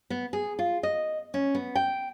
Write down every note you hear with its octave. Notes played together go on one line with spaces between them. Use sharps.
B3
G#4
F4
D#5
C#4
B3
G5